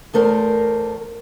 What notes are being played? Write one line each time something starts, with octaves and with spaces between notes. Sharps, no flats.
E2 A3 A#4 C5